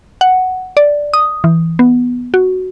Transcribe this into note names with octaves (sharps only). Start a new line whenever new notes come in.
F#5
D5
D#6
E3
B3
F#4